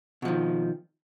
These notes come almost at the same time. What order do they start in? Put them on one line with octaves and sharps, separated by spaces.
B2 F3 D#3